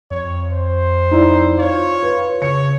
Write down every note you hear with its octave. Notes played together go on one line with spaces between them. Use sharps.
F2 C#5
C5
D#4 E4 D5
F4 C#5
B4
C#3 C#5 C#7